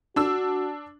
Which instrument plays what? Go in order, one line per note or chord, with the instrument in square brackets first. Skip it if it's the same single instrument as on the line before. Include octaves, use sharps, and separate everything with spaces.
[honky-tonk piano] D4 E6 [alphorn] F#4